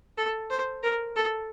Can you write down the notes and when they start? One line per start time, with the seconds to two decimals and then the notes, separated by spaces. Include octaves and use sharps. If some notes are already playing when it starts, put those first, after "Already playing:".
0.17 A4
0.50 C5
0.83 A#4
1.16 A4